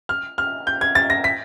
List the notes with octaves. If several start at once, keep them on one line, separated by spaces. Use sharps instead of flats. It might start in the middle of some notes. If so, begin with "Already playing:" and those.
F6
F6
G6
G#6
A6
A#6
B6